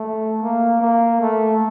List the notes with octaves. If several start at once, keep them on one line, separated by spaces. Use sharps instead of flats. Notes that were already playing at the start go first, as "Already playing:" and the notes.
Already playing: A3
A#3
A#3
A3